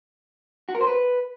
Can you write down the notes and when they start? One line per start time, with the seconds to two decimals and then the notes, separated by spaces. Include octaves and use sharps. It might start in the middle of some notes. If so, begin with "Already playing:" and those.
0.69 F#4
0.75 A#4
0.81 C5
0.87 B4